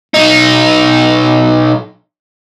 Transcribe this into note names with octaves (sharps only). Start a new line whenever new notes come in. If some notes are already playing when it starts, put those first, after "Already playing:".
B1 D#4